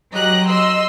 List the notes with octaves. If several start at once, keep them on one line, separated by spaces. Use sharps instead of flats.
F#3 G4 D#5 A#5 F#6
D#5 C6 E6